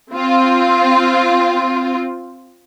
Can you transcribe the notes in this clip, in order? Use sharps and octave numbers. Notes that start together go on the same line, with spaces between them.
C4 F4